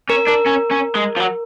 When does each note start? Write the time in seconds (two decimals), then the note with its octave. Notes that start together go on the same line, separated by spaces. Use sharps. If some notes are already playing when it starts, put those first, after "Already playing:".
0.10 C#4 A#4
0.28 D4 A#4
0.47 C#4
0.71 C#4
0.96 G#3
1.17 F3
1.20 F#3